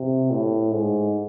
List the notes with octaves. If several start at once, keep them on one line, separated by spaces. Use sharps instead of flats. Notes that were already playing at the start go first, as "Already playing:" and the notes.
Already playing: C3
A2
G#2